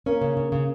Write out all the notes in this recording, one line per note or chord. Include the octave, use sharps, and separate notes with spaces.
A#3 C#4
C#3
C#3
C#3